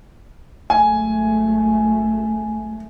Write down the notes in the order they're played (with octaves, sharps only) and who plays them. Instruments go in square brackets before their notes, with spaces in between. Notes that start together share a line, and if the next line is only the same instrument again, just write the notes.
[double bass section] G#1 F#2 A3 [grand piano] G#5